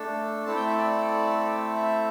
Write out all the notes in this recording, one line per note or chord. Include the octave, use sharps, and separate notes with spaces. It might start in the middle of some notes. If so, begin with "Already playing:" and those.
Already playing: A3 D4 A4
A3 C4 E4 A4 A5
G5
E5
D5
E5